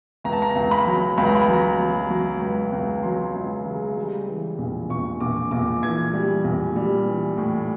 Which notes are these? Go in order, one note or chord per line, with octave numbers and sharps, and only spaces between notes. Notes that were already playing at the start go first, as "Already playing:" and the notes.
C#2 A#5
A5
A#5
C#2
B5
F#3
C#2 B5
A#5
B5
F#3
F#3
F#3
C#2
C#2
F#3 C6
C#2
C#3
G3
E3
A#1
A#1 C#6
A#1 D6
A#1 D6
E3 G#6
G3
A#1
G3
E3
A2